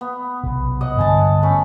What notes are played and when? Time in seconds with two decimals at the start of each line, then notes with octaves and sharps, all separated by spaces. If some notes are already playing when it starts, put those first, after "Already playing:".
0.01 B3
0.43 B1 C3
0.81 D#5 F#5
0.99 G2 D3 B3 G#5 A5
1.43 A3 C#4 B5